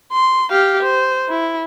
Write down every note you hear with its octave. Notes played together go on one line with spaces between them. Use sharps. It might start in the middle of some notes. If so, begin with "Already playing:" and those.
C6
G4 F5
C5
E4